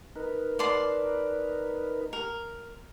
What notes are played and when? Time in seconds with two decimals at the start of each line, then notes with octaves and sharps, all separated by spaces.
0.15 D#4 A#4 B4
0.59 D5 A5 C6
2.13 A#4